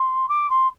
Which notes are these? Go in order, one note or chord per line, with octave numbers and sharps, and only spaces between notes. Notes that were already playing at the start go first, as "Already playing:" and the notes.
Already playing: C6
D6
C6